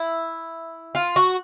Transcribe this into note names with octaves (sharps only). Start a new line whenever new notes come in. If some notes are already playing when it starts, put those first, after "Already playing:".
Already playing: E4
F4
F#4